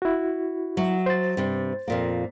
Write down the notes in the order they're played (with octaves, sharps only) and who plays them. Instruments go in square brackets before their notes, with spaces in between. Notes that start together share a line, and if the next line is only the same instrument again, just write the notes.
[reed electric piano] E4 F#4
[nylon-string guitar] F#3 E5
[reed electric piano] C5 A6
[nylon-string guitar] G2 C3
F2 A#2 A#3